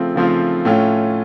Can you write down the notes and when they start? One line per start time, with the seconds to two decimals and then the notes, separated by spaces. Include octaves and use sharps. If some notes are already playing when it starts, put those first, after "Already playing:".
Already playing: C#3 F3 A3 C4 F4
0.16 C#3 F3 A3 C4 F4
0.65 A2 A3 C#4 F4